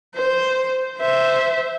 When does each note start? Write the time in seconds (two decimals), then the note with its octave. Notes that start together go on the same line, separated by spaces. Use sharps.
0.15 C5
0.98 C5 E5